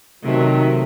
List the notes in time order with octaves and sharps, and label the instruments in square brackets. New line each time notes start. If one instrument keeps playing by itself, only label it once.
[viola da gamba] C3 [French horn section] D#3 A3 [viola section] F#3 E5